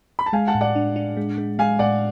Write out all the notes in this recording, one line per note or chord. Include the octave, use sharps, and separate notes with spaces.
B5
A5
G#3 F5 G#5
F#5 A5
A2
D5 F#5
D4
D4
G#3
G#3
G#3 F5 G#5
A2 D5 F#5